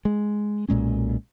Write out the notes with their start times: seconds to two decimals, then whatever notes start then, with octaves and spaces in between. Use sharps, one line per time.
0.05 G#3
0.69 B1 A#2 G#3 C#4